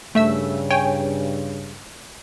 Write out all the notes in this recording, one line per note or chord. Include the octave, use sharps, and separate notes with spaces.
G2 C#3 A3 E5 E6
C#5 G5 G#5